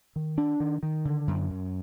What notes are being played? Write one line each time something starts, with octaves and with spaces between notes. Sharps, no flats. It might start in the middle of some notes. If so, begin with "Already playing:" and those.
D#3
D4
D#3
D#3
D3
F#2
F#2